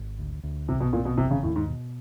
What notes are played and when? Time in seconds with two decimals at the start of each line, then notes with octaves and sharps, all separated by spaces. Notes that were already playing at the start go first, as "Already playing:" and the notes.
Already playing: G#1
0.19 D2
0.43 D2
0.68 B1 C3
0.81 B2
0.93 A#2 C4
1.05 B2
1.18 F1 C3
1.31 C#3
1.43 D#2 A2
1.56 G#2
1.68 B2